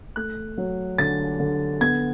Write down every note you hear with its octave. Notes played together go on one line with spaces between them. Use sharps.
A3 F#6
F#3
D3 A6
D3
B3 G#6